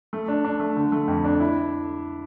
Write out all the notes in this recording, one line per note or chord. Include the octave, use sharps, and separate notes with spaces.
A3
D4
D4
A3
D3
A3
F2
D4
E4